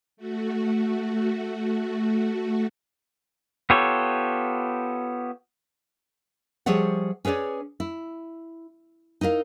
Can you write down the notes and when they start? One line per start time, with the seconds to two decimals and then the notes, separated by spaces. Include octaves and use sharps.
0.17 A3 F#4
3.70 B3 F4 G4 A4 C#5
6.66 F3 G3 G#4 C#5 E5 F#5
7.25 C#4 G#4 B4 C#5 D5
7.80 E4
9.21 D#4 E4 A#4 F5